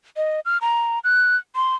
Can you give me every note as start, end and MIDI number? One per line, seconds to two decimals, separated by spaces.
0.17 0.40 75
0.45 0.58 89
0.61 0.99 82
1.04 1.36 90
1.56 1.76 84